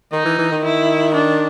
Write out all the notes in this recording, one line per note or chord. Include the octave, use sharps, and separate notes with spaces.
D#3 D#4
E3
E3
D#3
E4
D4